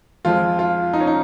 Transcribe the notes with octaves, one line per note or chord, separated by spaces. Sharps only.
F2 F3 G#3 F4
F4
D#4
C#4
D#4